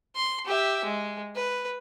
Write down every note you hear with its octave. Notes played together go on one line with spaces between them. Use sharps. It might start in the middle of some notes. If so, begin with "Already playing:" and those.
C6
G4 E5
G#3
B4